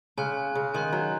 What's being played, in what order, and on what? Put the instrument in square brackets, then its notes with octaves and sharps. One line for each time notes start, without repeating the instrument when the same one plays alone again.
[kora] C#3 [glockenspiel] G#5 C6 F#6
[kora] C#3
[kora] D#3 [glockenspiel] G#5 C6 F#6
[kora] F#3